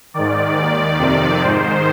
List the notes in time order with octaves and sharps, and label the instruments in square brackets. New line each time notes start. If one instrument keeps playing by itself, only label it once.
[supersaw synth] G#2 D#3 D5
D#2 D#3 D5
F2 C3 D#3
G#2 D#3 C5